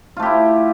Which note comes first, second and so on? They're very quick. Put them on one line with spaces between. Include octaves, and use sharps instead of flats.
F4 A3 G4 E4